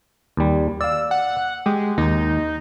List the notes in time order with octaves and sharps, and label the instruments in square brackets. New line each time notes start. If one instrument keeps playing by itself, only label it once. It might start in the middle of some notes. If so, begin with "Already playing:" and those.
[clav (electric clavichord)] D#2 G3
[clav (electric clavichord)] D5 F5 [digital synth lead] E6
[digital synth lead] F#5
[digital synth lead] G#3 [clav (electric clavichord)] G4
[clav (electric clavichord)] D#2 [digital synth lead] D#4